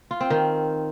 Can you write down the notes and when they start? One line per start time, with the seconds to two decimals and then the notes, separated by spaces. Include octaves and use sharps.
0.11 F4
0.21 C4
0.30 D#3